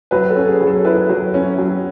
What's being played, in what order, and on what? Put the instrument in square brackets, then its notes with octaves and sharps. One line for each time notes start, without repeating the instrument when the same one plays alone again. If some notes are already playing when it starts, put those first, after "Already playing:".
[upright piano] F#3 B4
A4
C#4
G#4
F#3
A4
E4 B4
F#3
C#4
F#3